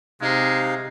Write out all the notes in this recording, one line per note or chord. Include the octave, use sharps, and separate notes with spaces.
C3 G#3 D#4 F5